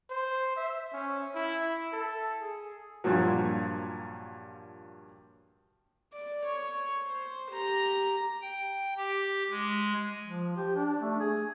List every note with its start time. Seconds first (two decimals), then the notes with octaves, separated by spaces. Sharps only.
0.10 C5
0.57 E5
0.93 C#4
1.35 E4
1.93 A4
2.41 G#4
3.04 G2 A#2 F3 F#3
6.13 D5
6.44 C#5
7.07 C5
7.51 G4 A#5
8.42 G5
8.97 G4
9.50 G#3
10.24 F3
10.57 G4
10.76 D4
11.02 A3
11.20 G#4